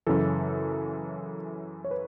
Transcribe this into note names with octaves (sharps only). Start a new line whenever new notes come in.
F#2 C#3 E3 A4
C#5
B4